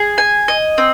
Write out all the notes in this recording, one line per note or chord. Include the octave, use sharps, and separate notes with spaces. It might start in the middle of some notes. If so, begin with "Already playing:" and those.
Already playing: G#4
G#5
D#5
C4